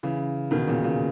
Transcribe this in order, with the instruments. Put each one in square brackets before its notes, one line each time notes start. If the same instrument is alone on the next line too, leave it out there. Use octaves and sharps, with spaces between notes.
[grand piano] C#3 E3
B2 D#3
A#2 C#3
A#2 C#3